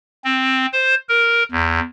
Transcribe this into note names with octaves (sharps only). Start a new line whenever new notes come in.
C4
C5
A#4
E2